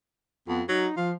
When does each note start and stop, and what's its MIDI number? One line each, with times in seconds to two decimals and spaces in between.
0.48 0.63 41
0.48 0.61 59
0.69 0.87 54
0.69 0.96 63
0.97 1.13 53
0.97 1.11 65